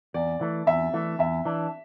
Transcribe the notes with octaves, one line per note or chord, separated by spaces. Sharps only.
E2 D5
E3 A3
E2 E5
E3 A3
E2 E5
E3 D4